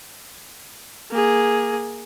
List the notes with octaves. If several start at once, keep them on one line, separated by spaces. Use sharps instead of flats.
A#3 G#4